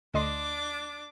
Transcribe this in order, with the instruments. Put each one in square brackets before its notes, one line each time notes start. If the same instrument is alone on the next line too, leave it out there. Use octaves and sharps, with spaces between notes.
[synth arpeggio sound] D2 D#5 C6 [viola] D4 D6